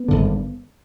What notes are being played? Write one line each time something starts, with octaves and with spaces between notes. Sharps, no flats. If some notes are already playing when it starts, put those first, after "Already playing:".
Already playing: B3
G#1 G2 D3